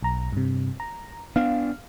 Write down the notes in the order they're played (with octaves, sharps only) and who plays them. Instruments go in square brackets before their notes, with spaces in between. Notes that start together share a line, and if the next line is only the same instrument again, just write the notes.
[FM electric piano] B1 A#5
G2 C3
A#5
[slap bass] B3 D4 [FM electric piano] F5